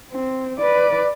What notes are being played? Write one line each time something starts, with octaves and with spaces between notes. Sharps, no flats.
C4
B4 D5